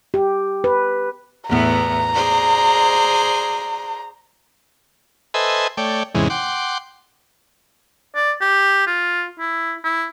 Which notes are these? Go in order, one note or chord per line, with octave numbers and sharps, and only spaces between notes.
G4
B4
E2 A2 B3 A#5
G#4 C5 D5
A4 B4 C5 D#5 E5 G#5
A3 C#5 D5 G5
E2 G#2 C3 E3 G#3 C#4
F#5 G5 C6 D6
D5
G4
F4
E4
E4